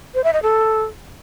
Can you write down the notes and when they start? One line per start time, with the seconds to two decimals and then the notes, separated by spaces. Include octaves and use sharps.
0.14 C5
0.24 E5
0.33 D#5
0.43 A4